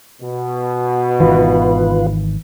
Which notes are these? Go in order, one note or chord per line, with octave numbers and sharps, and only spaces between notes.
B2
G#1 D#3 E3 F4 B4